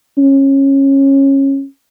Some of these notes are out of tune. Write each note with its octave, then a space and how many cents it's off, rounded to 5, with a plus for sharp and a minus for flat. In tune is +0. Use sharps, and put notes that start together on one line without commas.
C#4 -20